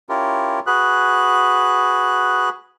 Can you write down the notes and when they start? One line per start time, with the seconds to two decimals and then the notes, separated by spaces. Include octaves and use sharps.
0.09 C#4 E4 F4 G4 A#4
0.67 F#4 G#4 B4 F#6